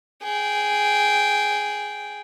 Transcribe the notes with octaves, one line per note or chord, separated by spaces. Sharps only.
G#4 G5